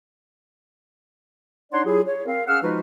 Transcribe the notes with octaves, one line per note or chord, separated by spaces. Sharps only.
D4 D#4 C#5 D5 F#5 C6
F#3 E4 F4 G4 G#4
C#5
C4 A#4 F5
C#4 G#4 F5 F#5 E6 F6
F3 G#3 D#4 F4 F#4 B4